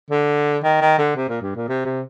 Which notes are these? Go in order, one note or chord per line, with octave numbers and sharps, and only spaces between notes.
D3
D#3
D#3
D3
C3
A#2
G2
A#2
C3
C3